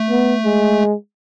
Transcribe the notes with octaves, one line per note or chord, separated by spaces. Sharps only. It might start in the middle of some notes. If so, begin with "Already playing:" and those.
Already playing: A3
B3
G#3